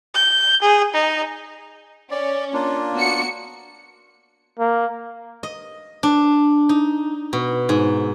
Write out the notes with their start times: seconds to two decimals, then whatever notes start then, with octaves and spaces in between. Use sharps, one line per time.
0.15 G6
0.62 G#4
0.94 D#4
2.11 C#4 D5
2.54 A#3 D4 F4
2.96 B3 F#4 C#7
4.59 A#3
5.43 D#5
6.03 D4
6.69 D#4
7.33 B2
7.69 G#2